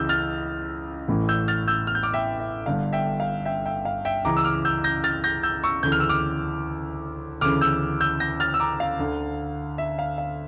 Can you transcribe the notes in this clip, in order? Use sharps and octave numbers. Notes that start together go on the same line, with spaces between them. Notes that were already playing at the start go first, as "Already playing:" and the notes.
Already playing: C#2 C#3 E3 E6 G6
F6 A6
A1 A2 E3
E6 G6
F6 A6
E6 G6
F6
G6
D6 F6
E5 G5
E5
G1 G2 D3 F5
E5 G5
F5
E5 G5
E5 G5
F5
E5 G5
C#2 C#3 E3 A#5 D6
E6
D6 F6
E6 G6
G6 A#6
F6 A6
G6 A#6
E6 G6
C#6 E6
D2 C#3 E3 G6
F6
E6
D6 F6
D2 C#3 E3 D6 F6
E6 G6
E6 G6
G6 A#6
F6 A6
E6
A#5 D6
F5
D2 D3
E5
F5
F5